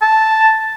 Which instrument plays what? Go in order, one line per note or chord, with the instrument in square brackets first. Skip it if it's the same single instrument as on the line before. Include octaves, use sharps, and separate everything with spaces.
[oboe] A5